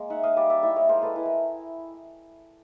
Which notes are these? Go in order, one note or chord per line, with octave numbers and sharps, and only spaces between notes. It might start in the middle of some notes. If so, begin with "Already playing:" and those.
Already playing: G#3 A#3
D#4 E5 F#5
D#5 F5
G3 D5 E5
D5 E5
E4 D5 E5
C#5 D#5
G#3 A#4 C5
A4 B4
E4 B4
A#4